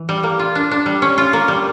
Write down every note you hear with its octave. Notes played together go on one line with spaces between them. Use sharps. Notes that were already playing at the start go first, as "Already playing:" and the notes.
Already playing: E3
G3
A#3
F4
D4
D4
G3
C#4
F4
A#3
G3